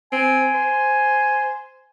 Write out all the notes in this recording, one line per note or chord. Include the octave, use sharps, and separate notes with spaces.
C4 G#5
C5